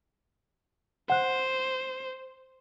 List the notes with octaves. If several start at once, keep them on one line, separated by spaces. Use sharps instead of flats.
C5 F#5 F#6